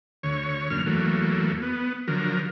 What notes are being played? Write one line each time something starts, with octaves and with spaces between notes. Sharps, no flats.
D2 C#5
F#2 D3 A#3 F6
E2 F#3 A3 A#3
B3
D3 F3 F#3 A#4